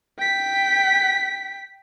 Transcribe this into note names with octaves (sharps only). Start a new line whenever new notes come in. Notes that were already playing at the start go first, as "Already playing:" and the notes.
G5 B6